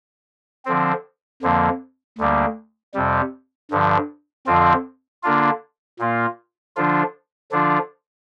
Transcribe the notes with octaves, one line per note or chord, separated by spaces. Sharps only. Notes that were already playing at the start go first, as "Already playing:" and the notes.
D3 F3 C4
F2 D3 F3 A#3
D2 D3 G3 A#3
F2 C3 G3
G2 D3 F3
F2 D3 F3 C4 F4
D3 A#3 D4 F4
A#2 A#3 F4
D3 F3 D4 F4
D3 F3 D4 F4